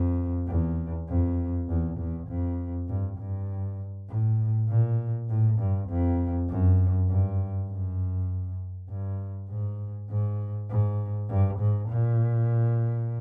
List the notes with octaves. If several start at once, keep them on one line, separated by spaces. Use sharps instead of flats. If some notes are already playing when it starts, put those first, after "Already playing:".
Already playing: F2
E2
F2
E2
E2
F2
G2
G2
A2
A#2
A2
G2
F2
F#2
G2
F#2
G2
G#2
G#2
G#2
G2
G#2
A#2